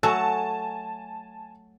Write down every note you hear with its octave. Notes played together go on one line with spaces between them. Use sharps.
F#3 A3 F#4 G#5 A5